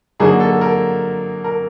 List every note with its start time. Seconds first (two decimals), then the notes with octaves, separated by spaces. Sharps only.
0.19 D3 F#3 A#3 D#4 G#4
0.40 A4
0.61 A#4
1.44 A#4